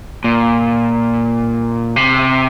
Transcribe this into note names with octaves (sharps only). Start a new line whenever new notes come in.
A#2
C3